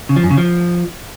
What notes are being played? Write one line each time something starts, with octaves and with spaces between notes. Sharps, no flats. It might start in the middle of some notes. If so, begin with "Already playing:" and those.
C#3
F3
F#2
C#3
F3